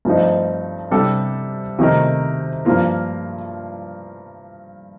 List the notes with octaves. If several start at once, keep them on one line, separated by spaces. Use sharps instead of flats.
G2 F3 A3 C4 D#4
C3 G3 D4 A4
C3 D#3 A3 D#4 A#4
G2 F3 A#3 F4 A#4